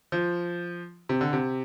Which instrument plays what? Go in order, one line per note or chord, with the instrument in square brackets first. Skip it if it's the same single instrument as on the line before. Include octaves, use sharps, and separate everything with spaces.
[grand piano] F3
C3
D3
C3